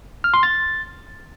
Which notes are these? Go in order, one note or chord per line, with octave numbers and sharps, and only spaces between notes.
F6
C6
A6